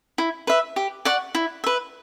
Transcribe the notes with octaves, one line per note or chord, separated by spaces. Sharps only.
E4
B4 E5
G4
D5 F#5 C#6
E4
B4 E5